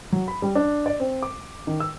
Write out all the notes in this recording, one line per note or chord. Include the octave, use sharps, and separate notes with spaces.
F#3
B5
G3
D4
D5
C4
D6
D#3
E6